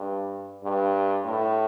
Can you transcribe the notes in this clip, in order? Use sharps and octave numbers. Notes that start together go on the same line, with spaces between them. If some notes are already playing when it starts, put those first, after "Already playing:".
Already playing: G2
G2
A2